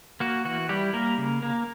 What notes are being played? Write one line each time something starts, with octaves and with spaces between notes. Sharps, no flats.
A#3 F#4
E3 F#4
G3 E4 G4
G3 A#3 A#4
C#3
A#3